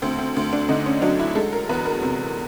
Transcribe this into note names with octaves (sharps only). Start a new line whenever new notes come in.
D2 C4
C4
D2
D4
D3 D#4
C#4
F#3 D4
E4
G#3 A4
A#4
E2 B4
A#4
C3